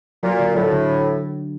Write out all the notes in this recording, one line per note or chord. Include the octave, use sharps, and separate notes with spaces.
A#2 F#3
D3
A2 F#3
D3